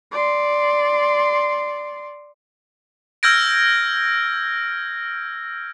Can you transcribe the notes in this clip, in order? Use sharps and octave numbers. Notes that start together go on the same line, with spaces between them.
D5 C6
E6 F6 G6 G#6 A#6 D7